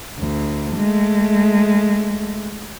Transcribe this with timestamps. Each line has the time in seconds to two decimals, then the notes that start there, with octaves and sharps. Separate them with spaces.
0.18 D2
0.73 G#3 A3